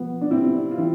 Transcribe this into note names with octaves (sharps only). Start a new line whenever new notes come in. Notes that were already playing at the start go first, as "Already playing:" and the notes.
Already playing: B2 F3 B3
D4
C3 C4 E4
F4
E3 C4 E4